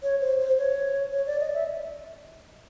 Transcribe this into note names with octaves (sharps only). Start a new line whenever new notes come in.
C#5
C5
C5
C#5
C#5
D5
D#5
E5